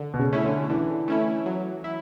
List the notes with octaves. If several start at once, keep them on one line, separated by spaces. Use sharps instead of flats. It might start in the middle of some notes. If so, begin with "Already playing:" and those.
Already playing: D3
B2
C#3
A3 C#4 E4
D3
D3 E3
A3 C#4 E4
F#3
E4